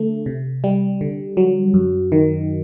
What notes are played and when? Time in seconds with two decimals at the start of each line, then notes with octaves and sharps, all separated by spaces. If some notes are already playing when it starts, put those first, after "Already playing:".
Already playing: D3 A3
0.26 C3
0.64 G3
1.01 D3
1.37 F#3
1.74 F#2
2.12 D#3